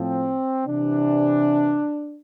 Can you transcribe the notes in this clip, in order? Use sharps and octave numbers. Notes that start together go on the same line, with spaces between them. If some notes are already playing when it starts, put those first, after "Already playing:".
Already playing: A2 F3 C4
C3 E3 D4